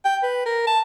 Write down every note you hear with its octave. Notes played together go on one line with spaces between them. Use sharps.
G5
B4
A#4
A5